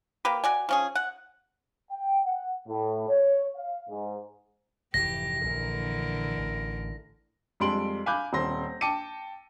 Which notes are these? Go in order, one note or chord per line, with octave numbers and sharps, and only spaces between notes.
A#3 G4 B4
F#4 D5 G#5
F3 C#4 G#4
F#5
G5
F#5
A2
C#5
F5
G#2
F1 F2 G#2 E3 G4 A#6
A#1 A#2 D3 E3 A#4
A1
F2 G3 G#3 C6 D7 F#7
F5 G#5 B5 D6 F#6 G6
D#1 C4 C6 A#6
G5 A5 D6 C#7 D#7